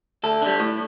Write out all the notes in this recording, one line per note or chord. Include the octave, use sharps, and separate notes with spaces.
D2 A4
D3 G3
A2